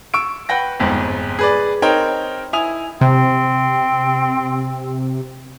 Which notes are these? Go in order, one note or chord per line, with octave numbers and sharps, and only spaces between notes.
C#6 E6 D7
B4 F#5 G5 A#6
G1 F2 G#2
G#4 B4 D5
C4 D#4 A#4 C#5 G5
E4 G#5 D#6 F7
C3 C4